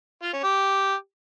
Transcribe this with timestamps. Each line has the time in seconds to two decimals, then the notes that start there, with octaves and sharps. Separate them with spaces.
0.23 F4
0.33 C#4
0.43 G4